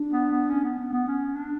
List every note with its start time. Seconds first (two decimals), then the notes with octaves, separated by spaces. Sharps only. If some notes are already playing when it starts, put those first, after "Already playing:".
Already playing: D4
0.13 B3
0.31 B3
0.50 C#4
0.64 B3
0.79 B3
0.93 B3
1.08 C#4
1.36 D4